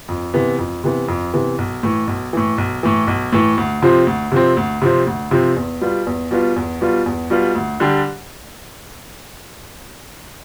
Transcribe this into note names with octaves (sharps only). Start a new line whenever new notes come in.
F2
C3 E3 B3
F2
C3 E3 B3
F2
C3 E3 B3
B1
A2 E3
B1
A2 E3
B1
A2 E3
B1
A2 E3
D2
C3 F3 C4
D2
C3 F3 C4
D2
C3 F3 C4
D2
C3 F3 C4
E2
B2 G3 B3 F4
E2
B2 G3 B3 F4
E2
B2 G3 B3 F4
E2
B2 G3 B3 F4
D2
D3 G3 D4 G4